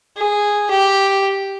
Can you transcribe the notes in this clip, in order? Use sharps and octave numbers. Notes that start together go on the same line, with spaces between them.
G#4
G4